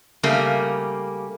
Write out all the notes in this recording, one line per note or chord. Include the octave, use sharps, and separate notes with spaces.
C#3 G3 A3 A#3